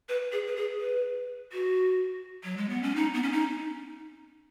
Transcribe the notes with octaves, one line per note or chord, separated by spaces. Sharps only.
B4
G#4
B4
G#4
B4
F#4
F#3
G#3
B3
C#4
D#4
B3
C#4
D#4